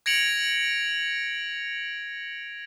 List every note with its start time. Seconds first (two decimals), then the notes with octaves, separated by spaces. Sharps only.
0.06 G#6 A#6 C#7 D7 F7 F#7